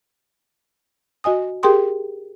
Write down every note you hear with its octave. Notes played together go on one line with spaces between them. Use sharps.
F#4 D#5 G#5 D#6
G4 G#4 A#4 G5 C6 D#6